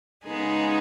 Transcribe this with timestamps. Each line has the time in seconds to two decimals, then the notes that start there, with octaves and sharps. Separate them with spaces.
0.25 C#3 G#3 B3 D#4 G#4